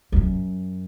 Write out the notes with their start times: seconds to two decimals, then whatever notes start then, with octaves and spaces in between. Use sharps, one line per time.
0.12 F2
0.16 F#2